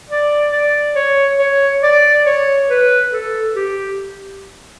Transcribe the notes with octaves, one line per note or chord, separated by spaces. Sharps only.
D5
D5
C#5
C#5
D5
C#5
B4
A4
G4